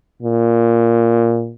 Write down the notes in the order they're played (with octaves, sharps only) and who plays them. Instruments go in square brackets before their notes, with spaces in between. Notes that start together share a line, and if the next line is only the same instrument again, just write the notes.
[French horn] A#2